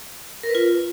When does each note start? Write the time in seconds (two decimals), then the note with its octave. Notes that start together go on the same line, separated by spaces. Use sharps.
0.43 A#4
0.49 B4
0.55 F4